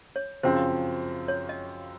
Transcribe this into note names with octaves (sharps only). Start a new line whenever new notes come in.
C#5
F#2 C#3 F3 C4 C5
C#5
D#5